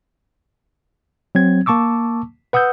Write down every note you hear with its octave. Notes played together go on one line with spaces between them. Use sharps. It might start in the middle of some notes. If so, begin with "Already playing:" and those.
F#3 C4 G#6
A#3 A5 C#6 D6 E6
B4 F#5 D#6 E6 G6